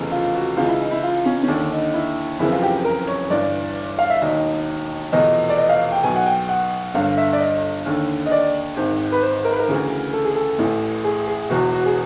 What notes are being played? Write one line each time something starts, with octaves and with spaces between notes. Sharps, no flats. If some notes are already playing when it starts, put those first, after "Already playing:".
Already playing: F1 E2 C#3
F4
F#4
C#2 C#3 E3 F4
E4
D#4
E4
F4
C#4
C#4
D#2 D3 D4
D#4
E4
F#1 F2 C#3 E3 E4
F4
G4
A#4
C#5
G1 G2 E3 D5
F5
E5
E1 D#2 D#3 D#5
F1 E2 B2 D#5
D5
D#5
F5
G5
B1 B2 G#5
F#5
G5
F#5
G1 G2 D3 F5
E5
D5
D#5
D#2 D3
D#5
D5
G#1 G#2 D#3
B4
C5
A#4
B4
A#4
D2 C#3 E3
A4
G#4
A4
A1 A2 E3
G#4
G#4
E1 E2 B2 F#4
F#4
G#4